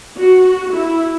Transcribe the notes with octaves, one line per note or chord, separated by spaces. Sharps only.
F#4
E4